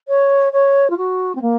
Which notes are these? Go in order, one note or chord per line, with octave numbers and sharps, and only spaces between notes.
C#5
C#5
F4
F#4
C4
A#3